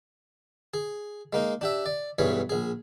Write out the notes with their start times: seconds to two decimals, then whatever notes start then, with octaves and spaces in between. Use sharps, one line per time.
0.74 G#4
1.33 G#3 A#3 D#4
1.61 D4 G4 E5
1.86 D5
2.19 B1 G2 E3 G#4 C#5 C#6
2.49 A#1 G#4